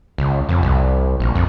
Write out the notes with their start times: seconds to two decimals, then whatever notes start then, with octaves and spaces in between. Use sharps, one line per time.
0.18 C#2
0.49 F2
0.63 C2
1.20 A#1
1.35 F2